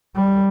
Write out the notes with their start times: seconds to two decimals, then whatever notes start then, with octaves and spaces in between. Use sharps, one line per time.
0.15 G3